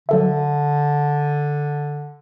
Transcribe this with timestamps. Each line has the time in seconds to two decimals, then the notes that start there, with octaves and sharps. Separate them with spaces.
0.09 D3 F#3 A4 E5